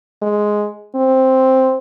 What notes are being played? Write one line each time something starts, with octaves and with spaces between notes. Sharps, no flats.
G#3
C4